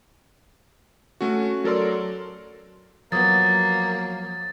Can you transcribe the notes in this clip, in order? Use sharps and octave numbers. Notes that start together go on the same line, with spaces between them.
A3 C#4 F#4
F#3 A4 A#4 D5 C6
F3 F#3 A#3 B3 D#6 A6